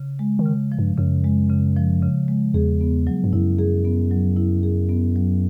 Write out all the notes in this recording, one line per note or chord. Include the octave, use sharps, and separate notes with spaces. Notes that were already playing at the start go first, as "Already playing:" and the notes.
Already playing: C#3
G#3
D#3
C#3
F3
G2
F#2 C#3
G#3
C#3
F3
C#3
G#3
E2 G#4
B3
F#3
G2
F#2 E4
G#4
B3
F#3
E4
G#4
B3
F#3